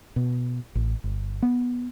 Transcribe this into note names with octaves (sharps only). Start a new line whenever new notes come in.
B2
A1
G1
B3